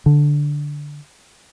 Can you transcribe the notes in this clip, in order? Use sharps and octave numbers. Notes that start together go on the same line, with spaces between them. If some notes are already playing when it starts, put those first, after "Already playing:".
D3